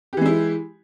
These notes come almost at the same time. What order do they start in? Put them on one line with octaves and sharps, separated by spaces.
G4 E3 G#3 E4